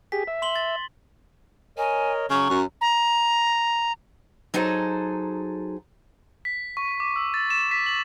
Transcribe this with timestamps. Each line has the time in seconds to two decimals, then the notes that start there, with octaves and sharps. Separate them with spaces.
0.12 G4 G#4 B6
0.27 E5
0.42 C6 F#7 G7
0.56 A6
1.78 A#4 C#5 D#5 G#5
2.30 C#3 F#3 C#6
2.50 F#2
2.81 A#5
4.54 F#3 D#4 G#4 A4 C5
6.45 B6
6.77 C#6
7.00 D6
7.16 E6
7.34 A6
7.50 E7
7.71 B6
7.86 F#7